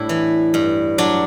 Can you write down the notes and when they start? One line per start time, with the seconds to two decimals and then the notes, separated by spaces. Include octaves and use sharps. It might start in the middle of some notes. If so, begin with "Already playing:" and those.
Already playing: A2 G3 D4 E4
0.09 E3
0.54 G2
0.98 F#3 D4